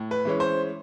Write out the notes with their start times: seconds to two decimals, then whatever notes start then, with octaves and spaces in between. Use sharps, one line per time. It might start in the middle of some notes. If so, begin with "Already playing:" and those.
Already playing: A2
0.11 B4
0.25 E3 G#3 C#4
0.40 C5